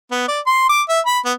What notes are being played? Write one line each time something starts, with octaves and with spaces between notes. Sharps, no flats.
B3
D5
C6
D6
E5
B5
B3